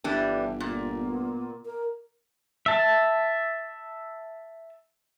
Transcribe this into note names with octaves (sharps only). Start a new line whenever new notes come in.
G1 E3 G3 D4
A#2
B3
A#4
E5 A5